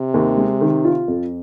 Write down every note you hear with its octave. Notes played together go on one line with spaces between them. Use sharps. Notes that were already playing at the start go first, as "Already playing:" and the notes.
Already playing: C3
D#2
G#3
D#3
F4
F2